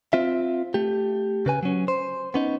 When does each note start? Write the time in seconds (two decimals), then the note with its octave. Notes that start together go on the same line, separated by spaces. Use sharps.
0.13 C4 F4 E5
0.74 A3 G4
1.46 C#3 B4 G#5
1.63 F#3 C#4
1.88 C5
2.34 B3 C#4 D#4